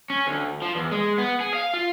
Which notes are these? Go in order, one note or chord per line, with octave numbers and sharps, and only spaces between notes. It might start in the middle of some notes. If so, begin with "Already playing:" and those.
C#4
D2
F3
E2
G#3
B3
G#4
F5
F4